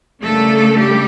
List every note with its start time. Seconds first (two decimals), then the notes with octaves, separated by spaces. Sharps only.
0.22 C#3 G3 A3 A#3 D4 A4
0.77 G3 G4